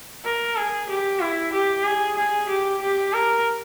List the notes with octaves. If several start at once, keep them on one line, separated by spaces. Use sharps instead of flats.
A#4
G#4
G4
E4
G4
G#4
G#4
G4
G4
A#4